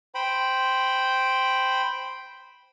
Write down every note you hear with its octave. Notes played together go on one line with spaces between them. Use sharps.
C5 G5 B5